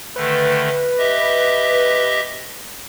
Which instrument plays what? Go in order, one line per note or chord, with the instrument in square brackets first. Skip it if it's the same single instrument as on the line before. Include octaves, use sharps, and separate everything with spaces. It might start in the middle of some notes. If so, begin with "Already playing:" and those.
[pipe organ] D3 D#3 A3 [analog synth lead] B4
[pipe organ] G4 D#5 E5